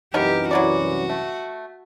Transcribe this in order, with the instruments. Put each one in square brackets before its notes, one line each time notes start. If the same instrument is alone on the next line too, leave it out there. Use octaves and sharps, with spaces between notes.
[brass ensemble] C2 F#2 E3 [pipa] B3 D#4 A#4 [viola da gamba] G4
[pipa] F#3 E4 D5 [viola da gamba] F#4
[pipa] A3